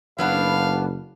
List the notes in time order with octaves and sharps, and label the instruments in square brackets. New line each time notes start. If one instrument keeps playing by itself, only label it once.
[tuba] F#1 [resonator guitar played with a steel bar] F#3 B3 D4 [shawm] F5